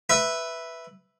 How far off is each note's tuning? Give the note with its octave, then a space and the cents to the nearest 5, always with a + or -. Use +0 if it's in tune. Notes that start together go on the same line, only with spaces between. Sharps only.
B4 +0 E5 +0